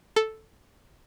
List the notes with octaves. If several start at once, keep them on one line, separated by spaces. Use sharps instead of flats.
A4